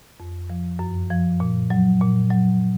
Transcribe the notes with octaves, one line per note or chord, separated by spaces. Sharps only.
F2
F3
F#2
F3
A#2
F#3
A#2
F#3